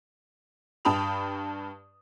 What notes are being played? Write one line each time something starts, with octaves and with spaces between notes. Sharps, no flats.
G2 G5 A5 B5 D#6 F7